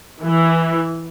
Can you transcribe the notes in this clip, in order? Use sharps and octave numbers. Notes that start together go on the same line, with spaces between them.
E3